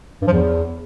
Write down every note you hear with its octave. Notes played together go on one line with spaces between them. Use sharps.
G2
F3
E2